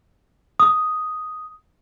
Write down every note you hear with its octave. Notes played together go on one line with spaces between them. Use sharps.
D#6